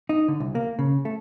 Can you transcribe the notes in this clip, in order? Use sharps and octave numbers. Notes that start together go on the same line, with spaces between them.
D#4
D3
C2
A#3
C#3
A3